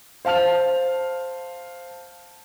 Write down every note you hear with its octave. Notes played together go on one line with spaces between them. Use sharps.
C5 F5 A5 F6 F7